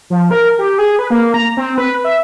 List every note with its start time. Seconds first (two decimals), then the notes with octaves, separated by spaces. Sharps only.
0.10 F3
0.31 A#4
0.59 G4
0.78 G#4
0.99 B4
1.10 A#3
1.34 A#5
1.57 C4
1.78 B4
2.04 E5